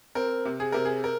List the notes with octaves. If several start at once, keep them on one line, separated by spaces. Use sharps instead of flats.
C4 A#4
C3
G#4
C3 A#4
G#4
A#4